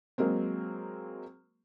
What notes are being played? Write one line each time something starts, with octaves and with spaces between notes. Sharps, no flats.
F#3 G#3 A#3 C4